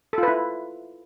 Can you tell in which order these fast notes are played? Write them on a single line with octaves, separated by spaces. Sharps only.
A4 F4 B4 E4